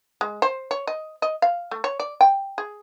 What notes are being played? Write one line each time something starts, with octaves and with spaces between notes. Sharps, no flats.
G#3
C5
C#5
D#5
D#5
F5
A3
C#5
D5
G5
G#4